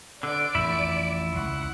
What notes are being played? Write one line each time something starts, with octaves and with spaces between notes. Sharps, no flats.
D3 D5 D7
A1 F2 E4
C#2 F#5